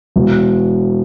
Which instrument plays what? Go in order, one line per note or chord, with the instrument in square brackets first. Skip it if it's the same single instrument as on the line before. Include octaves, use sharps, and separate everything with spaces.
[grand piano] E1